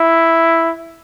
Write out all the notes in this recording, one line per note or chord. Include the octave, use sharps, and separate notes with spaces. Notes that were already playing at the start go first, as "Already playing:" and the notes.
Already playing: E4